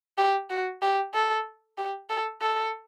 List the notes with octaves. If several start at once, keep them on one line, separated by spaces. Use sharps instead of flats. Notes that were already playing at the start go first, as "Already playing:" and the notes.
G4
F#4
G4
A4
G4
A4
A4